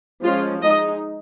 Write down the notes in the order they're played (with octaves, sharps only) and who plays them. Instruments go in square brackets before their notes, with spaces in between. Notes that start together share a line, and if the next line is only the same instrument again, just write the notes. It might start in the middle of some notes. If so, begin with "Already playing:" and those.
[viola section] F3 G#3 C#4 F4
G#3 D#4 D#5